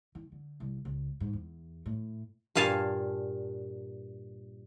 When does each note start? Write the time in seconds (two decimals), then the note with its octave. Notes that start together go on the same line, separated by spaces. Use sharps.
0.15 E3
0.32 D3
0.60 C2
0.85 C#2
1.20 G#2
1.33 E2
1.86 A2
2.55 G2 A#2 F5 G#5 A5